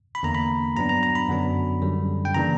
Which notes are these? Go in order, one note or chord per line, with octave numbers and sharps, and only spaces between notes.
B5
E2 D3 A#3 A#5
B5
G2 F#3 B3 D4 A#5
A#5
A#5
B5
F#2 D3 F#3 B3 D4
F#2 D3 G3
G5
C#3 E3 A#3 D4 A#5